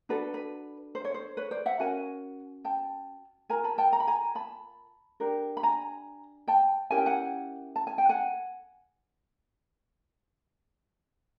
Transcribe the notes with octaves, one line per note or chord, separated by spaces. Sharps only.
D4 F#4 A4 B4
B4
C5
C#5
C5
B4 C#5
C5 D5
E5 F#5
C#4 F#4 A#4 F#5 G#5
G5 A5
F4 A#4 G#5 A#5
A5 B5
G5 A5
A#5
B5
G#5 A#5
A5 B5
D4 G4 A#4
B5
G#5 A#5
G5 A5
C#4 E4 G4 A#4 G#5
G5
F#5 G#5
A5
G#5
G5
F#5 G#5